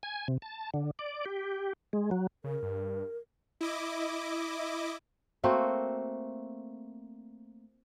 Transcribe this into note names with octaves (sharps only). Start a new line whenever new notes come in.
G#5
C3
A5
D3
D5
G4
G#3
F#3
C#3 A#4
G2
E4 D#5 D6
A3 A#3 C4 F#4